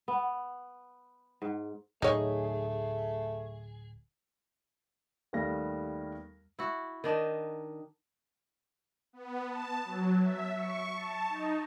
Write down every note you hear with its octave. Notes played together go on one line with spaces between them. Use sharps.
B3
G#2
D1 A3 D#4 G#4 C#5
D#2 G3 A3 B3 F5 A#6
E4 F#4
D#3 D4 D#4
B3
A5
F#3
E5
C#6
A5
D#4